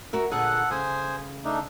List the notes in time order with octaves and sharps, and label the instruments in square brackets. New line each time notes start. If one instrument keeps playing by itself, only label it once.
[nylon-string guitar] F#4 A#4 E5
[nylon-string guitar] A#2 D3 G#4 [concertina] A4 F#5 F#6
[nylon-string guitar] C#3 [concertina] C5 G#5 D#6
[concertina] A3 D4 D#4